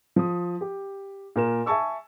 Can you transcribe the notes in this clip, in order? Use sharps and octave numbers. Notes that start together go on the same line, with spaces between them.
F3 D#6
G4
A#2 A#4 E7
E5 G#5 A5 C#6 E6